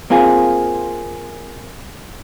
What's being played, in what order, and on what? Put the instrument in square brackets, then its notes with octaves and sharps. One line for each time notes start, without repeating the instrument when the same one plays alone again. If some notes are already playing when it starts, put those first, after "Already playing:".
[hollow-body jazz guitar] A#3 C4 F4 G#4